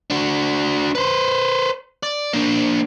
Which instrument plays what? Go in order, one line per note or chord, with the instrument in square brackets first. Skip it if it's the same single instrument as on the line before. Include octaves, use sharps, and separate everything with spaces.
[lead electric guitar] D4 F#4
B4 C5
D5
A#3 D4